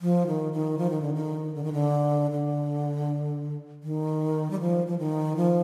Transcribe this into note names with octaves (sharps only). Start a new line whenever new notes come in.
F3
D#3
D#3
F3
D#3
D3
D#3
D3
D#3
D3
D3
D#3
G3
F3
F3
D#3
F3